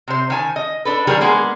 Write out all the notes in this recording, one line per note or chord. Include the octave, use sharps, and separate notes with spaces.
C3 C5
D#3 G#5 A5
D#5
D4 A4 B4
D#3 F#3 G3 G#4 A#4
G#3 A#3 B3 G#4